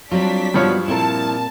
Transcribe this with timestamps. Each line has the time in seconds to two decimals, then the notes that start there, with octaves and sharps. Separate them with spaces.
0.12 F#3 G3 C4 D4 F4 B6
0.54 G2 F3 B3 F#4 C#5
0.88 A#2 C4 E4 A#4 A5